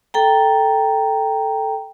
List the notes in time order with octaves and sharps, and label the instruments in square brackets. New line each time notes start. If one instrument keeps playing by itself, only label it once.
[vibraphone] A4 G5 A#5